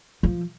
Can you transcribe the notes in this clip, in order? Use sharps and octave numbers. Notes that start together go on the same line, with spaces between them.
F3